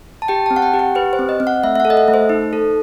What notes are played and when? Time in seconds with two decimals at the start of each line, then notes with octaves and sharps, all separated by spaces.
0.22 A5
0.28 G4 G5
0.46 C4 A5
0.56 F#5
0.62 G5
0.74 G4
0.79 F#5
0.95 G4 B4
1.13 C5
1.19 C4
1.29 D#5
1.40 C4
1.47 F#5
1.63 A3 E5
1.75 E5
1.80 A4 F#5
1.90 D#5
1.97 E5
2.08 A3
2.14 C5
2.29 D#4
2.53 A4